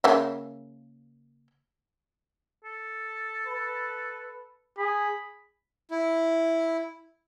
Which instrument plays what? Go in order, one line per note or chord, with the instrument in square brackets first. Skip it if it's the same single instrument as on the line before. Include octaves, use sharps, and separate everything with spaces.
[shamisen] C#3 A#3 E5
[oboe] A4
[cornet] B4
[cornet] G#4 [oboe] B5
[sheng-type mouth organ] E4